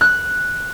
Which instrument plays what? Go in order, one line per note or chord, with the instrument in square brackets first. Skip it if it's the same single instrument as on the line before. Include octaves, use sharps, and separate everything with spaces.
[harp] F#6